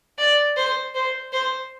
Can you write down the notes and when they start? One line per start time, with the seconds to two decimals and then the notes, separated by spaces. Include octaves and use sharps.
0.18 D5
0.56 C5
0.95 C5
1.33 C5